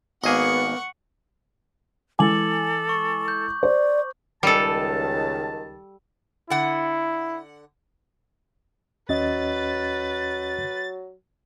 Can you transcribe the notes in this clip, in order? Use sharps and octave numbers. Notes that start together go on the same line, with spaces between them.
G#1 A#3 B3 G#4 D#5 F#5 C#6
E3 G#3 A4 G#5 D6 F#7
C#6
G6
C5 D5
C#2 D#3 G3 A4 A5
D3 E4 F#5
D#2 F#3 C#4 B4 D#5 A6